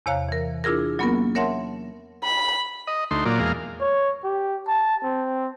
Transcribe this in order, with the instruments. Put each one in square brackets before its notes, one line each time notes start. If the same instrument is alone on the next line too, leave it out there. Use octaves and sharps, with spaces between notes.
[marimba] E2 C3 C#5 F5 A#5 F#6
E3 A#4
D4 E4 F4 G#4 A#4
F#3 A#3 B3 C#4 F4 A#4
A#4 C#5 E5 F#5 A5 C6
[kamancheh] B5
[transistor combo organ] D#5
D2 A3 D#4 C6
A#2 F#3 A#3 F4 D5
E2 G#3 A#4 F5
[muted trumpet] C#5
G4
A5
C4